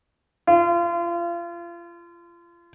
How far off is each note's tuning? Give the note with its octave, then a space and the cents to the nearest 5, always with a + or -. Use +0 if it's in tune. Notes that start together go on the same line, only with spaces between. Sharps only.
F4 -30